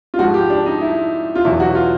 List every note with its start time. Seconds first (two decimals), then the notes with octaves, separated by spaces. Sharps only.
0.14 F4
0.19 G#2 F3 F#4
0.34 G4
0.50 D4
0.66 D#4
0.81 E4
1.35 F4
1.44 E2 B2 F#3 E4
1.60 F#4
1.75 F4